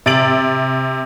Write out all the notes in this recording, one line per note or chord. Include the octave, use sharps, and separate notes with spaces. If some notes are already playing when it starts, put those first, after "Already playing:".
C3 A6 D7 F#7